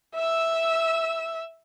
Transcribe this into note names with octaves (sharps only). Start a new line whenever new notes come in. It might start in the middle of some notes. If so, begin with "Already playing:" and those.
E5 E6